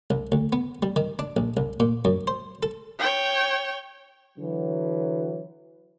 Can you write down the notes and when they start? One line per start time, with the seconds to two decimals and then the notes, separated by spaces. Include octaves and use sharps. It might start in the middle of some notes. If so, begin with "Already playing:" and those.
0.10 C2
0.32 D2
0.53 B3
0.83 G3
0.96 D#3
1.19 D4
1.37 A#1
1.57 C2
1.80 A#2
2.05 F#2
2.27 C5
2.63 A4
2.99 C#5 G5
4.38 D3 E3 F#3